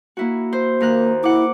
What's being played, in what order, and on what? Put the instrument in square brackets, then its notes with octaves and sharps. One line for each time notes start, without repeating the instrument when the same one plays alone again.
[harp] A#3 E4 F#4
C5
[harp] D#2 A#4 F#6 [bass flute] A#3
[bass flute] E4 [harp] F#5 D6